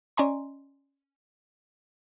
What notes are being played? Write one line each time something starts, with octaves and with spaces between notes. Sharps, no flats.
C#4 D5 D#5 G#5 A#5 C6